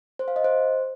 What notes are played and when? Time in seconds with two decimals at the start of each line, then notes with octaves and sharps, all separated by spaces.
0.19 C5
0.28 F5
0.36 D#5
0.44 C5